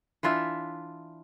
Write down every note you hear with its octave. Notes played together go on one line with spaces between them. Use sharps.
E3 D4 F4 E5